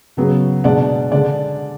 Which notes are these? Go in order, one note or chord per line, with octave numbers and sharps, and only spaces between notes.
C#3 F#3 B3
B2 G#3 D4 D5 F#5
D3 G#3 D4 D5